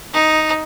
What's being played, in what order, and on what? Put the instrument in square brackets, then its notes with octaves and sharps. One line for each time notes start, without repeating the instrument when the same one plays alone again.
[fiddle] D#4